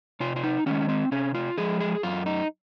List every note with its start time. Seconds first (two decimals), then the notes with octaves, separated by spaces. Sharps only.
0.20 C3 F4
0.36 F4
0.43 D#4
0.66 D#3 G#3 C#4
0.89 C4
1.12 C3 C#4
1.34 F4
1.58 F3 G#3 G#4
1.80 G#4
2.03 F#2 F4
2.26 D#4